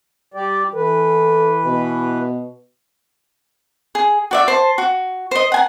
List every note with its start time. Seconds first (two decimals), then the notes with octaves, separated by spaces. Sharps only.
0.34 G3 G4 D5
0.74 E3 A4 B4
1.65 B2
3.95 G#4
4.31 F#4 D5 E5
4.48 C5 A5
4.78 F#4
5.31 C5 D#5
5.52 F#5 G#5 A#5